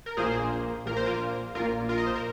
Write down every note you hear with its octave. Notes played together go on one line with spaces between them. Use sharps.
A#4
A#1 A#2 A#3 G#4 C5
A#1 A#2 A#3 A#4
C5
F4 A#4
A#1 A#2 A#3 F4 A#4
F4 A#4
D#5
C5
A#4